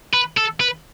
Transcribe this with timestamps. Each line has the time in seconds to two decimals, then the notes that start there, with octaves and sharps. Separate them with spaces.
0.14 B4
0.37 A4
0.60 B4